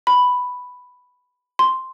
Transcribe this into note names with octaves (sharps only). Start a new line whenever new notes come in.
B5
C6